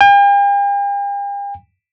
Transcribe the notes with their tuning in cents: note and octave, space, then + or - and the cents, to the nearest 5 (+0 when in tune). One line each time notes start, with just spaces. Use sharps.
G5 +45